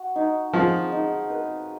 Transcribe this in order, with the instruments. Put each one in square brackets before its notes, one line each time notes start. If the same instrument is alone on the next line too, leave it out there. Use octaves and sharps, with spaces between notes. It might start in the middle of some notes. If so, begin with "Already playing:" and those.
Already playing: [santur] F#4
D#4
[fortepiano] F3 [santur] G#4
[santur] D#4
B4